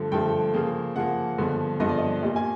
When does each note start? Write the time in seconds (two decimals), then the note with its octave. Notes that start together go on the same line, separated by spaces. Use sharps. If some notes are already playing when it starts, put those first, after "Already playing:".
Already playing: G2 D3 F3 A3
0.12 G2 D3 F3 A3 G5
0.54 C#3 F3 A#3
0.96 C#3 F3 A#3 F#5
1.38 G2 D3 F3 G#3 B3
1.80 G2 D3 F3 G#3 B3 D#5
1.89 D5
1.98 D#5
2.22 A#2 G3 A#3 D#5
2.36 G#5